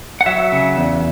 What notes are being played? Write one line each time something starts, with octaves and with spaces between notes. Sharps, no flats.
F#5
F#3 E5
C#3
E2